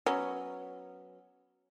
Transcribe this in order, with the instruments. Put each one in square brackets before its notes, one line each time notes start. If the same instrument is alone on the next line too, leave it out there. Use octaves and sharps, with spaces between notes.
[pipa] F#3 B3 C#4